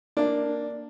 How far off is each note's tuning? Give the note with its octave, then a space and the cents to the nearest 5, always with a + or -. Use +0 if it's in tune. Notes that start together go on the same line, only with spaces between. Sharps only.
A#3 +0 D4 +0